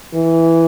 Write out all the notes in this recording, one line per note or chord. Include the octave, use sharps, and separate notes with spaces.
E3